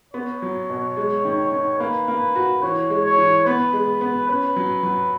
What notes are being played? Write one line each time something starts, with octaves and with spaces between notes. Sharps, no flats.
B3 C#5
F#3
B2
G#3
D#3
D#3
A#3 B4
A#3
F#4
E3 C#5
G#3
C#5
E3
B3 B4
G#3
B3
C#4 B4
F#3
F#3